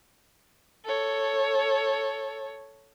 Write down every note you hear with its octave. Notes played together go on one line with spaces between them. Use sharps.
A4 C#5